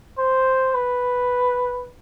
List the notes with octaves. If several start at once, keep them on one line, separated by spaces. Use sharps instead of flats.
C5
B4